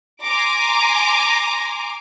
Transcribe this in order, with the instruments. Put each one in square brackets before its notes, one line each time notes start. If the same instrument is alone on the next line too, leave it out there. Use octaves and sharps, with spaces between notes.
[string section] G#5 A#5 C6 D6